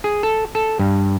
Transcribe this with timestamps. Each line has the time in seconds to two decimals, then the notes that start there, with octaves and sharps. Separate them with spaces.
0.04 G#4
0.23 A4
0.55 A4
0.79 G2